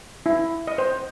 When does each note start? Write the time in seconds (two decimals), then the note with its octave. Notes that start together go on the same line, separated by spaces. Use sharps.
0.26 E4
0.67 D#5
0.78 C5